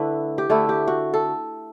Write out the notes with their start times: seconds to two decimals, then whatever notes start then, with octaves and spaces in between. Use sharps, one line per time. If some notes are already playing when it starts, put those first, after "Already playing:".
Already playing: D3 A3 E4 B4
0.38 G4
0.50 D3 A3 E4 A4
0.69 G4
0.88 F#4
1.14 A4